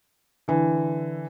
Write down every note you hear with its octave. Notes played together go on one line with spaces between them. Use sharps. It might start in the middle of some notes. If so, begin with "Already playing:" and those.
D3 E3